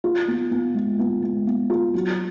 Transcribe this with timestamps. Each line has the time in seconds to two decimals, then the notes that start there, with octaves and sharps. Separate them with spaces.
0.04 F4
0.28 B3
0.51 B3
0.74 G#3
0.99 B3
1.22 G#3
1.47 B3
1.70 F4
1.94 F#3